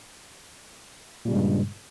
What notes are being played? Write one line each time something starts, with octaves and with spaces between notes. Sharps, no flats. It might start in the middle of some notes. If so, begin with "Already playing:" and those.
G2 A#2 C#3 G3 G#3